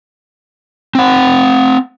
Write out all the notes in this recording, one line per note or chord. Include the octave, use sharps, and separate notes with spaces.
C4 F#5